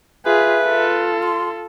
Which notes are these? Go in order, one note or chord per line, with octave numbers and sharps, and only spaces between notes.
F4 G#4 B4 E5
F4 A4
C6